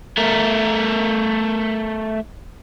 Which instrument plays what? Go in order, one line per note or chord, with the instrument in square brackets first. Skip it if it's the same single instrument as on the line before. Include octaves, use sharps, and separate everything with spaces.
[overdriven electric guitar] A3 A#4